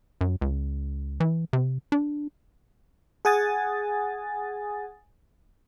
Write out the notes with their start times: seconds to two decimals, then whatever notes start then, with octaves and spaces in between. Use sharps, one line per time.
0.21 F#2
0.41 C#2
1.20 E3
1.53 C3
1.92 D4
3.25 G#4 F#5 G#5 D#6 A6